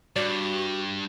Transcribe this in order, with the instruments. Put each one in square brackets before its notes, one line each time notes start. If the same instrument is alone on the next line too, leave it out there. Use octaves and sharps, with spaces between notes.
[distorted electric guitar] G2 [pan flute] F#4 [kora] D5